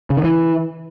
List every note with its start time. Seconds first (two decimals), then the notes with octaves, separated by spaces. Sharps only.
0.10 C#3
0.17 D#3
0.24 E3